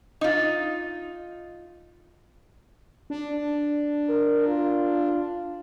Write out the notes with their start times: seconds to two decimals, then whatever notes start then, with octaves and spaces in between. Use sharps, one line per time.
0.21 D#4 F4
3.10 D4
4.09 A#4
4.47 F4